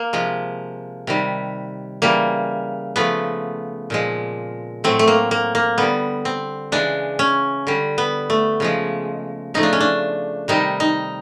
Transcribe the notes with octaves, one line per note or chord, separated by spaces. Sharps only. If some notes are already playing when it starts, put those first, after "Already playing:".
Already playing: A#3
C3 F3 G#3
C3 D#3 G3
C#3 E3 G3 A#3
C#3 F3 A3 B3
A#2 F3 G#3
A2 F#3 A3 C4
A3
A#3
A#3
A#3
D3 G3 B3
C4
C#3 E3 G#3 D4
C#4
D3 G3
B3
A3
C#3 F3 G#3
C#3 F3 A3 D#4
D4
C#4
D4
C3 D#3 G3 D#4
D#4